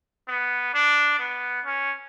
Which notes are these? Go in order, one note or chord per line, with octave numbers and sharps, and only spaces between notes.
B3
D4
B3
C#4